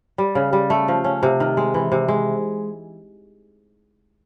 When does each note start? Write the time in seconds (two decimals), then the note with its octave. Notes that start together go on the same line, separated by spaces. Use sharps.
0.18 G3
0.35 C#3
0.53 G3
0.70 A3
0.88 F3
1.04 C#4
1.23 C3
1.40 D#3
1.57 G#3
1.74 E3
1.92 C3
2.08 G#3